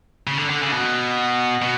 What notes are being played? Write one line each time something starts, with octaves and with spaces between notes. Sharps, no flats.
C#3
D3
D3
C#3
B2
B2